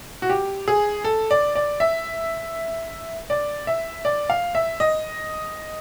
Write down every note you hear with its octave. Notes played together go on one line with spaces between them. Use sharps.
F#4
G4
G#4
A4
D5
D5
E5
D5
E5
D5
F5
E5
D#5